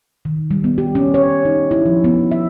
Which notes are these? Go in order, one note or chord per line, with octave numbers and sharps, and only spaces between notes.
D#3
G3
B3
G4
C#4
C#5
D#4
E4
F3
B3
E5